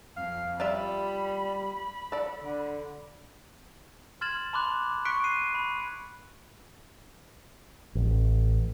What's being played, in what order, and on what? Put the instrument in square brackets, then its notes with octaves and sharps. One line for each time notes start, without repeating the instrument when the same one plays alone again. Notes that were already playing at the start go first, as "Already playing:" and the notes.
[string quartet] F2 [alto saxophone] F5
[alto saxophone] G3 [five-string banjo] F4 D5 E5 [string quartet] B5
[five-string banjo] A4 D5
[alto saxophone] D3
[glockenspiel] C6 F6 G#6 A6 E7 F#7
A5 B5 C6 D6 F#6
C#6 F#6 B6 C#7 D7
C7 D#7
B5
[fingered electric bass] A1